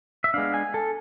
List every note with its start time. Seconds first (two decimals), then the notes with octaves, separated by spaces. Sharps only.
0.24 E5
0.34 G#3 B3 D4 F5
0.54 G#5
0.74 A4